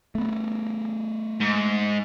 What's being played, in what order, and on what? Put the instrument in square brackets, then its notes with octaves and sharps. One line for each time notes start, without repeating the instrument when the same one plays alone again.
[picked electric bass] A3 B3
[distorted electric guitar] G#2